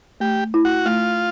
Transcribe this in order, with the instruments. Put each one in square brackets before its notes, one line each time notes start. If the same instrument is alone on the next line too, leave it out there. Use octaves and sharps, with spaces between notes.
[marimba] A3 [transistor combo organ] G4
[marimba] E4
[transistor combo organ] F#4
[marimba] A3 [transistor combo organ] F4